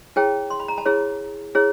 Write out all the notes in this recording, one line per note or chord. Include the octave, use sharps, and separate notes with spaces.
E4 G#4 C#5 G5 A5
C6
B5
A#5
A5 B5
E4 G#4 C#5
E4 G#4 C#5